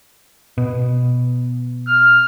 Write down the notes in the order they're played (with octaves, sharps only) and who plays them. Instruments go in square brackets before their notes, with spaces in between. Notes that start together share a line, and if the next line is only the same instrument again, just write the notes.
[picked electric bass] B2
[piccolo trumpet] F6